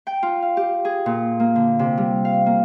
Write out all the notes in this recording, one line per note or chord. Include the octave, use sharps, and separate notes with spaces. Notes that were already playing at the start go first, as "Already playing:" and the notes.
G5
F4
F5
G4
G#4
A#2
A#3
D3
C3
G3
F5
A#3